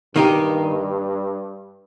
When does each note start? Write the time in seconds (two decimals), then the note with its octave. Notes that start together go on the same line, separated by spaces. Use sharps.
0.15 G2 D#3 A#3 D#4 G4